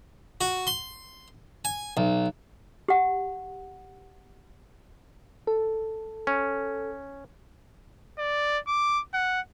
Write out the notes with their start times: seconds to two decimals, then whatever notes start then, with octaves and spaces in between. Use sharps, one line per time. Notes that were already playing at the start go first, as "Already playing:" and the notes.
0.41 F#4
0.67 C6
1.65 G#5
1.97 B1
2.88 G4 F#5
5.47 A4
6.27 C#4
8.18 D5
8.68 D6
9.14 F#5